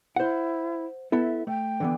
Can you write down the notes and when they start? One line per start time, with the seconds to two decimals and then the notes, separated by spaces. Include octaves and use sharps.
0.16 E4 C5 F#5
1.12 B3 E4 A4 E5
1.47 A3 G5
1.80 D3 E3 B3